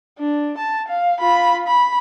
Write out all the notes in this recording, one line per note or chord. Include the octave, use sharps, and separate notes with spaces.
D4
A5
F5
F4 B5
B5